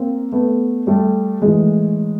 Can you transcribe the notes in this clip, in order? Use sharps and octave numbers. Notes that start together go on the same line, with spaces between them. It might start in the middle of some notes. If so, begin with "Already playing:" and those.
Already playing: A#3 C4
A3 B3
G3 A3
A2 E3 G#3